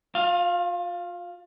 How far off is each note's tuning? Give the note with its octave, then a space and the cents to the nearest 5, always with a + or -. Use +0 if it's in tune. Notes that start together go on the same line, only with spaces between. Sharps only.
F4 +35 F5 +0